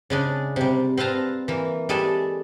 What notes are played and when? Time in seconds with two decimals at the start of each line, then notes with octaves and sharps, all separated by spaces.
0.10 C#3 G#3 D4
0.56 C3 G3
0.97 C4 B4 F5 A5 A#5
1.48 E3 A#3
1.89 G3 G#3 A4 E5 G#5